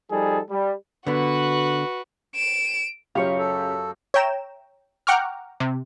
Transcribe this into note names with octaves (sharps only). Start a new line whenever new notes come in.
F3 G3 D#4 G#4 A4
G3
D3 B3 F#4 B4
D7 E7
F#2 C#3 F4 G4 C#5 F5 C#6
A4
C#5 E5 G5 A#5 E7
F#5 G5 A#5 C#6 D6 F6
C3